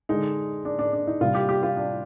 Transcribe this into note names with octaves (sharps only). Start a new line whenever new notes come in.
D3 G#3 D#4
D4
D4
D4
D#4
C3 G3 F4
G4
G4
F4
D4